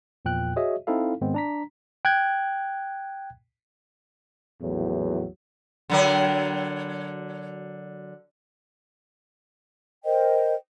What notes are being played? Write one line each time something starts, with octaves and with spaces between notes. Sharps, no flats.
E2 A#2 F3 G5 F#6
F#4 G#4 C#5 D#5 E5
C4 D#4 E4 A4 F5
G#2 D#3 G#3 B3 C4
D4 A#5 B6
G5 F#6 G#6
A#1 E2 A2 F#3
D3 F#3 A#4
A#4 C5 D#5 G5